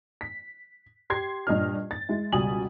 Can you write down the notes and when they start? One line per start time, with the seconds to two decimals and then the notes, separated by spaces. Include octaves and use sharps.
0.21 B6
1.10 G4 C6 G#6 C7
1.47 G2 A#2 D#5 F6
1.91 A6
2.09 G#3 E4
2.32 C#2 B2 G3 G#5 D#6 F#7